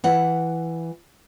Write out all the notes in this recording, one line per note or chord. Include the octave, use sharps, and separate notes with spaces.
E3 F#5